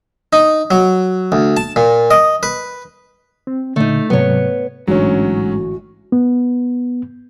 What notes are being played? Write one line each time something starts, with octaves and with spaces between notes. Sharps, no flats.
D#4
F#3
D2
A5
A#2
D#5
B4
C4
A#2 D3 A3 D#4
G#2 C3 F#3 B3 C#5
A1 G#2 D3 F#3 C#4 F#4 C#5
B3